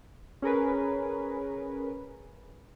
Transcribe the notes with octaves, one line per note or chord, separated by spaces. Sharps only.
C#4 G#4 A#4 B4